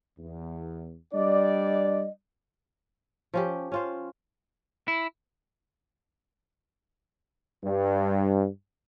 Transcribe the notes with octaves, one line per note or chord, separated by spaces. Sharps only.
E2
G3 D4 D5 D#5
F3 C#4 G4
C#4 F4 C5
E4
G2